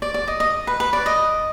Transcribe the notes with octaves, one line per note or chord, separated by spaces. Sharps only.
D5
D5
D#5
D#5
B4
B4
D5
D#5